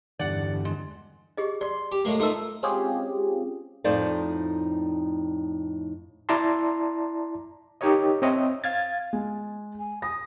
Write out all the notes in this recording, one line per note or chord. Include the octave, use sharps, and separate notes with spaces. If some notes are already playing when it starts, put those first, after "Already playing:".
E2 G2 D3 D5 F#5
G#3
G4 G#4 D#5
D5 C6 D6
G4
A2 G#3 A#3
A3 D#4 F4 A4 A#4
G#3 C4 C#4 F4 G4 G#4
F2 A2 D#4 C5 D5 F5
E4 D5 A5 A#5 C6
D#4 G4 A#4 C#5 D#5
C4 C#5 D#5 E5
F5 G#6 A6
G#3
G#5
D#6 A#6